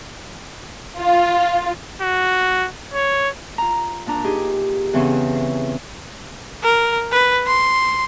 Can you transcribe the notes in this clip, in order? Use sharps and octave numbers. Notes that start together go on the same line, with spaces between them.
F4
F#4
C#5
F4 A#5
A#2 D4 A#5
D#4 G4 G#4
E2 C#3 E3 C4 C#4
A#4
B4
C6